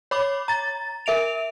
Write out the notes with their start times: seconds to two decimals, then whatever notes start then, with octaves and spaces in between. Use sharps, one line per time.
0.11 C#5 B5 D6
0.48 A#5 A6
1.06 A#4 E5 D7 F7